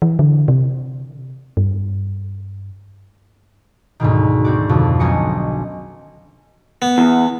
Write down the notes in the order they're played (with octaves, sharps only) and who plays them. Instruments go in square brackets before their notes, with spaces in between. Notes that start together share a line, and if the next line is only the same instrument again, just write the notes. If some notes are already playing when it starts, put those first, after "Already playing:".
[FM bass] E3
D3
C3
G2
[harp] D2 G#2 B2 D#3
C4 F#4 D5
F2 B2 D3
B1 C#4 D4 D#5 G#5 C#7
[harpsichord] B3
[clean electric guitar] E2